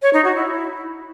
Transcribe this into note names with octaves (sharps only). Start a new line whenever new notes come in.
C#5
D#4
F#4
E4